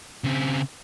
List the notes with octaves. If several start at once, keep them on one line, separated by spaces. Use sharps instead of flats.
C#3 C4